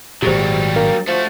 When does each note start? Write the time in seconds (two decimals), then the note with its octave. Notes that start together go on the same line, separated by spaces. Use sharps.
0.22 G#1 A#2 F#3 G3 G4 G#4 C5
0.76 A#3 D4
1.07 F3 A3 F#4